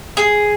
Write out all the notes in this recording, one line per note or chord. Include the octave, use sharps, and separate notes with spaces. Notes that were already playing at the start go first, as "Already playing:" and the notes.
G#4